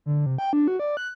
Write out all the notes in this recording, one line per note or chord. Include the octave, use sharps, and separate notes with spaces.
D3
C3
G5
D4
F#4
D5
F#6